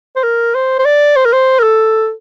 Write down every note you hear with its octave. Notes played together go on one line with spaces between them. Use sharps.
C5
A#4
C5
C5
D5
C5
A#4
C5
A#4
A4